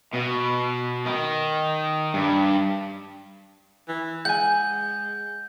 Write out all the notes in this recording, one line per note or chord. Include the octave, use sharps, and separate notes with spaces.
B2
D#3
G2
E3
G#3 F#5 G#5 G6